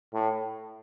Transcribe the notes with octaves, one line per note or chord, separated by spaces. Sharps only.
A2